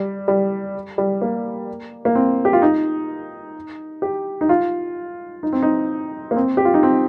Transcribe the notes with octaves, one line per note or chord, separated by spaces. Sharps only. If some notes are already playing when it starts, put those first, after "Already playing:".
Already playing: G3
G3
G3
A#3
A#3
C4
G4
F4
D#4
G4
D#4
F4
D#4
C4
D#4
A#3
C4
G4
F4
D#4
C4